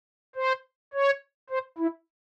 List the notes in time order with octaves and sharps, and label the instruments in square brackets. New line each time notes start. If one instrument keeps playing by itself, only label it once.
[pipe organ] C5
C#5
C5
E4